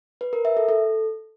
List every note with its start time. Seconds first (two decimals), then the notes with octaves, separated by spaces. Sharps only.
0.21 B4
0.33 A#4
0.45 E5
0.57 A4
0.69 A4